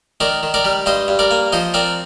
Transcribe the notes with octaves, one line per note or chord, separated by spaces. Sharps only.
D#3 A#4 D5
D#3
A#4 D5
G3
G2 C5 D#5
G2
A#4 D5
A#3
F3 C5 D#5
C4 A#4 D5